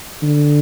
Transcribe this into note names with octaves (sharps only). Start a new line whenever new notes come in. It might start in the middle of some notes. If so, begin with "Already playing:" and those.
D3